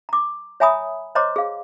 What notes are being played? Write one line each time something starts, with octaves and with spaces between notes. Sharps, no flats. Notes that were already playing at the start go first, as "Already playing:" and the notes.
A#5 D6
C#5 E5 G#5 A#5 B5 D#6
C5 C#5 D#5 A#5 C6 D6
G#4 F5